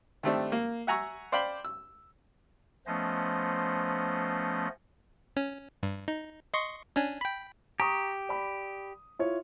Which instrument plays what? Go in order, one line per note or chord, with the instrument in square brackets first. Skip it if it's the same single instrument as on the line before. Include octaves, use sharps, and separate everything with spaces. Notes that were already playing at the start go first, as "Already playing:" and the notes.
[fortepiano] D#3 G3 A3 C4 D4
A#3
E5 F#5 G#5 A#5 C#6 E6
C5 D5 F5 G5 B5 C6
E6
[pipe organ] F3 A3 B3 C#4 C5 D#5
[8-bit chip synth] C#4
G2
D#4
D#5 C6 C#6
C#4 D4 G#5
G5 B5
[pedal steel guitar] G4 [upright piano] A#5 C#6 D#6
[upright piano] D5 B5
E4 F4 C#5